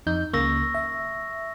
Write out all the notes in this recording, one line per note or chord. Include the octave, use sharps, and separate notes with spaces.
F2 D#4 G6
C#2 C#3 A#3 C#6 E6 A#6
E5